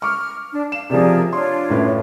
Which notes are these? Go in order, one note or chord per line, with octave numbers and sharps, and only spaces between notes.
C#6 D6 F6
D4
F5 E7
C3 F3 G#4 A#4 D5
D4 F4 C#5 C6
F#2 A2 B4